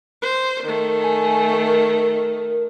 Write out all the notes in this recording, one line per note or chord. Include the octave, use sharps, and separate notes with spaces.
C5
D#3 A3
G#5
A#4